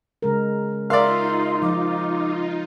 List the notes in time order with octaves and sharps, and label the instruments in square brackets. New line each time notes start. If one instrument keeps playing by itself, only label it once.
[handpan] C#3 G#3 A#4
[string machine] D#4 F4 [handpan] A#4 E5 [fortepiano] D5 F5 [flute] C6
[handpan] F3 [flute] D6